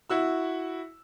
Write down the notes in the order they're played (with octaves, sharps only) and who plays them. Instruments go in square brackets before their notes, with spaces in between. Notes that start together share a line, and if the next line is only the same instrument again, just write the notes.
[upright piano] E4 F#4 E6